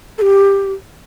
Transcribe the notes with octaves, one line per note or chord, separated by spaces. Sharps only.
A4
G4